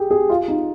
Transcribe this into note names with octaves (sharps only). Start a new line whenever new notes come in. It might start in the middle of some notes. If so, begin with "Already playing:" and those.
Already playing: G4 G#4
G#4
F4
D#4